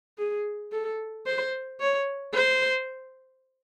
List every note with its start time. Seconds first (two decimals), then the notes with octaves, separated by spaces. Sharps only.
0.18 G#4
0.72 A4
1.26 C5
1.81 C#5
2.34 C5